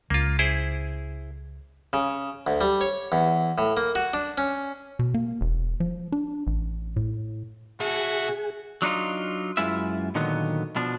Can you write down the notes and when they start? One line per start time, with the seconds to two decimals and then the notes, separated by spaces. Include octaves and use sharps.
0.10 C#2 A#3 F4
0.39 E4 G#4 C5
1.93 C#3
2.47 D2
2.61 G3
2.81 C#5
3.12 E2
3.58 A2
3.77 A#3
3.95 F#4
4.14 D4
4.38 C#4
4.99 B2
5.14 A#3
5.41 E1
5.80 F3
6.12 D4
6.47 A1
6.96 A2
7.80 B2 F#4 G#4 E5
8.82 F#3 D4 D#4 F4
9.57 F#2 G#3 E4 F4 B4 E5
10.15 A#2 D3 D#3 F#3 B3
10.76 B2 F3 D4